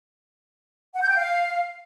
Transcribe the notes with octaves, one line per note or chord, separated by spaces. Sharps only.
F#5
G6
G5
F5